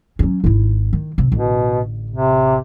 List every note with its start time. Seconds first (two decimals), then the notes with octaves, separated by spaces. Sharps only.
0.19 F#3 C#4
0.44 G#1 E4
0.93 D#3
1.18 C3
1.32 A1 B2 D3
2.10 C3